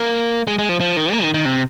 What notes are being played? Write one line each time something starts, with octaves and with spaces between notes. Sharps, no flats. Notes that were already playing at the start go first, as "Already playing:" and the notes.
Already playing: A#3
G#3
G#3
F3
F3
D#3
A#3
D#3
D#3
C3